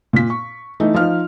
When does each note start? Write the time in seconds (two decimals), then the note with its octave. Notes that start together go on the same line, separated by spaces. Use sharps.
0.13 A#2 B6
0.30 C#6
0.80 E3 A3 D#4
0.94 F3 D#4 F6